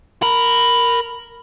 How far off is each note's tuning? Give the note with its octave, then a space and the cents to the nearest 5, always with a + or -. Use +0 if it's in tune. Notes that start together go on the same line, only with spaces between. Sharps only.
A#4 +0 B5 +5